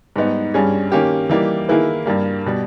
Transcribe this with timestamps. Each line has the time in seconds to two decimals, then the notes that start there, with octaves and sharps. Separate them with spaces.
0.16 G#2 G3 B3 D#4
0.54 G2 G3 C#4 G#4
0.92 D#3 A#3 C#4 G4
1.29 E3 G3 A#3 D#4 G4
1.69 D#3 A#3 E4 G#4 B4
2.06 G2 G3 A#3
2.46 B2 G3